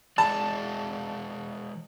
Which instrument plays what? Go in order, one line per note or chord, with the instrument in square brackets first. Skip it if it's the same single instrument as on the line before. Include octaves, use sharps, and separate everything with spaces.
[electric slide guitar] E3 G#3 D5 [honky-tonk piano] A5